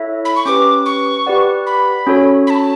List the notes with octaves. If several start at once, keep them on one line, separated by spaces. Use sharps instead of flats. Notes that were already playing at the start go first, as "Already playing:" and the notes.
Already playing: E4 A4 C#5 E5
B5
C#6
C#4 G4 B4 D6
C#6
G4 B4 D5 F#5
B5
C#4 F#4 A4 C#5
B5
A5